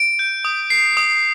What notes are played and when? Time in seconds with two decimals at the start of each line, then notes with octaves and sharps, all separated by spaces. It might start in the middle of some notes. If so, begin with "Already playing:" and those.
Already playing: D7
0.19 G6
0.45 D#6
0.70 C7
0.97 D#6